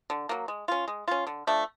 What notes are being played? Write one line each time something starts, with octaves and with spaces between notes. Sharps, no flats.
D3
F#3 A#3
G#3
C#4 F4
G#3
C#4 F4
D3
F3 A3 D4